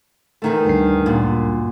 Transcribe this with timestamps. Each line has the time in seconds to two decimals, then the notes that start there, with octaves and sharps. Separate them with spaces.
0.42 E2 D#3 A3
0.65 D2 G2 C7
1.06 F#2 A#2